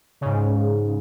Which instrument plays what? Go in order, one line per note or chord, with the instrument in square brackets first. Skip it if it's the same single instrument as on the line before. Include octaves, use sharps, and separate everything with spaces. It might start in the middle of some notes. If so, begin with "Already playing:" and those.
[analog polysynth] G#2 C#3